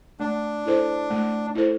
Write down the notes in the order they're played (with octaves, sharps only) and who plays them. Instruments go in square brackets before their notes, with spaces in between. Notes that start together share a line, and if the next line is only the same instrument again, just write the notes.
[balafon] A3 [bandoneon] D4
[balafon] E4 A4 C5
A3
E4 A4 C5